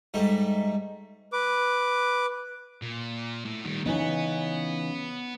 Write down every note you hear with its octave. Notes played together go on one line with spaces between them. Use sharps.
G#2 G3 A3 D#4
B4 D6
A#2
A2
D#3 G3
C#3 E3 B3 D#4